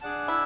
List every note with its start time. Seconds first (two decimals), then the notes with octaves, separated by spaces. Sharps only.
0.01 D4 G#4 D5 F#5 A5
0.28 E4